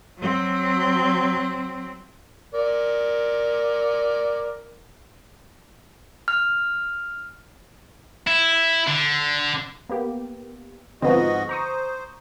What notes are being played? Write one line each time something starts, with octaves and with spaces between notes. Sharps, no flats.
F#3 C4
A#4 D5
F6
E4
D3
A#3 B3 G4
G#2 D3 F3 B3 C4 F#4 D#5
C5 A#5 C#6 D#6